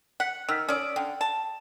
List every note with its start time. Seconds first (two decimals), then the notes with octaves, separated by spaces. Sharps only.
0.20 F#5 F#6 B6 C#7
0.49 D#3 E6 F6 B6
0.69 C#4 D5 D#6 E6
0.96 D3 G5
1.21 A5